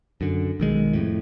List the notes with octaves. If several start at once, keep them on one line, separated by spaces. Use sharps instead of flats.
F#2 D3
B1 D#3 G#3
F2 A2